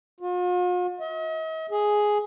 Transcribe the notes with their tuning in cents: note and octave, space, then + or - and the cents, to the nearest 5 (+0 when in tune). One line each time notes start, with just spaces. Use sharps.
F4 +45
D#5 +45
G#4 +5